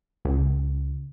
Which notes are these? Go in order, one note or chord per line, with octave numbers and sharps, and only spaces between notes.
C#2